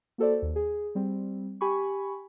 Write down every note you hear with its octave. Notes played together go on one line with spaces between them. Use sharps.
A#3 F#4 A4 C5 D5
D#2
G#4
G3 C4
G4 G#5 B5 C#6